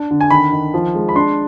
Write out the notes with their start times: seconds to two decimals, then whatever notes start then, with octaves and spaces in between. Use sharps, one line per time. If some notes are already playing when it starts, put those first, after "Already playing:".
Already playing: D4
0.11 D3
0.21 G#5
0.30 D#3 B5
0.52 D#3
0.74 F3
0.95 G#3
1.09 B5
1.15 D4 C6